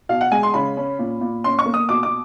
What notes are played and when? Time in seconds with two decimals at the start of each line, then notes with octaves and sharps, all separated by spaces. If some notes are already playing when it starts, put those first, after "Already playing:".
0.09 B2 F5
0.21 F#5
0.31 G#3 G#5
0.43 C6
0.54 C#3 B5
0.77 C#4
0.99 A#2
1.21 A#2
1.44 C#4 C6
1.59 C#6
1.66 A#3
1.74 D#6
1.89 B2 D6
2.03 D6